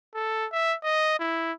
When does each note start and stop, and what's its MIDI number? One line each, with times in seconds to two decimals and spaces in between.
0.15 0.46 69
0.52 0.75 76
0.83 1.19 75
1.20 1.52 64